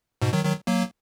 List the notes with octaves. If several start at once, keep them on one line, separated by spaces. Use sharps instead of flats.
G#2 B2
D#3 F#3
D#3 F#3
F#3 A#3